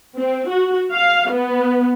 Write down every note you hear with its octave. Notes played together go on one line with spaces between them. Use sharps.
C4
F#4
F5
B3